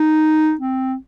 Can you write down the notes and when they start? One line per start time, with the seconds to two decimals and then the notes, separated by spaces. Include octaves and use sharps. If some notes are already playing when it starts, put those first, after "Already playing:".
Already playing: D#4
0.61 C4